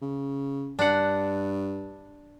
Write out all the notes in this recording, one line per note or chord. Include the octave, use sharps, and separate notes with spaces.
C#3
G2 D4 F#5